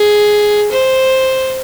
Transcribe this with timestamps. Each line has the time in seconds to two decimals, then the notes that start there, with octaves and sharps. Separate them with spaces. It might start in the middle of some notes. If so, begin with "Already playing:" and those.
Already playing: G#4
0.71 C5